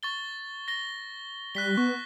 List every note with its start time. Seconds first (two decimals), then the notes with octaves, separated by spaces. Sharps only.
0.03 C#6 A6 G7
0.68 A#6 G7
1.55 G3 F#6 B6 G7
1.77 B3 C#6